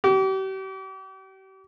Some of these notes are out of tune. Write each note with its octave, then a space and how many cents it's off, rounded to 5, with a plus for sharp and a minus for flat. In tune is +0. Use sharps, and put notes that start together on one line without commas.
G4 -40